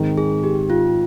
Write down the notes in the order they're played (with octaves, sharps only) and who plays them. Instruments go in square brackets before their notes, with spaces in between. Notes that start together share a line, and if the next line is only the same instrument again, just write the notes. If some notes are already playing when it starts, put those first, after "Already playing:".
Already playing: [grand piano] G#2 D#3 G#3 C4
[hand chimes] G#4
G4
F4